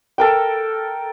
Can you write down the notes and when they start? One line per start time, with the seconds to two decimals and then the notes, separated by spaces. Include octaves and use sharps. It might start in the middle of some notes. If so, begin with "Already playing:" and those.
0.18 A4 A#4 G5